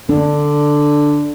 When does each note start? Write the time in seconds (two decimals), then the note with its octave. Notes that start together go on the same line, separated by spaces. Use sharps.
0.09 D3 D4